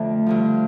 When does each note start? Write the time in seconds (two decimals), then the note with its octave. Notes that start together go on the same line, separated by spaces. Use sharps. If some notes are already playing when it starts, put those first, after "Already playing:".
Already playing: F2 D3 A3
0.26 G2 D3 F3